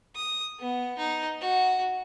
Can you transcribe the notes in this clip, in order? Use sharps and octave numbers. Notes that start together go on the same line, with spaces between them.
D#6
B3
D#4
F#4